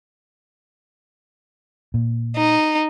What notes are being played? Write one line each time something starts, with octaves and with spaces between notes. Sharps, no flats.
A#2
D#4